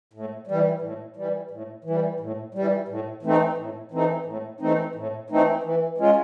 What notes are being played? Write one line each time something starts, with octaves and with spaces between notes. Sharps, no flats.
A2
E3 G3
A2
E3 G3
A2
E3
G3
A2
E3 G3
A2
E3 A3 C4 D#4
A2
E3 A3 C4 D#4
A2
E3 A3 C4 D#4
A2
E3 A3 C4 D#4
E3
G#3 C#4 F4